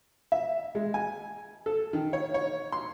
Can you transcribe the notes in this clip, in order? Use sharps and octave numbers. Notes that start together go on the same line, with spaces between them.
E5
G#3
G#5
A4
D#3
C#5
C#5
C6